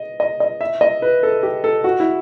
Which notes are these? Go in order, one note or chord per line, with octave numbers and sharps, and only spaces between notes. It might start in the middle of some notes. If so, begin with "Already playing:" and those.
Already playing: D#5
D#5
D#5
E5
D#5
B4
A4
G4
A4
F#4
E4